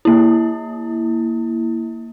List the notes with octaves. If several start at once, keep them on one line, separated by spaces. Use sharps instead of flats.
A#3 E4